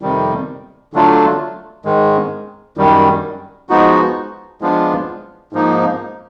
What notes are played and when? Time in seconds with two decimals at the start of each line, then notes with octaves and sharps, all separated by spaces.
0.02 F2 C3 D#3 G3
0.93 D3 F#3 A3 D4 F4
1.85 G#2 D#3 G#3
2.77 F#2 D#3 G3
3.69 F3 G#3 B3 D#4 F#4
4.61 F3 G#3 B3 D4 F4
5.53 G#2 F3 A#3 D#4